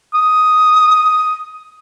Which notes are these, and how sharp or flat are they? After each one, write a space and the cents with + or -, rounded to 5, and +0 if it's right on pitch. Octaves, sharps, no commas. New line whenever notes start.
D#6 +5